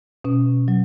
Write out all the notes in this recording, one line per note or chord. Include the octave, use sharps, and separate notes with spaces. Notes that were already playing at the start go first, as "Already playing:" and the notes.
B2 C#4
F#3